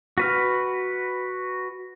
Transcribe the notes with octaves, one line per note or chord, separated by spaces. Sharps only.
F#4 B4 F6